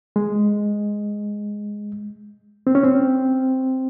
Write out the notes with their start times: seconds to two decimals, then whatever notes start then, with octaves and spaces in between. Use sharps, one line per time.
0.16 G#3
2.67 C4
2.75 C#4
2.84 C4